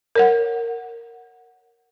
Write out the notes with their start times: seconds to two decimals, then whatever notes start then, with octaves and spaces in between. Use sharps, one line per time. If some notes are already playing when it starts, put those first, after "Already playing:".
0.16 A#4 C#5 F#5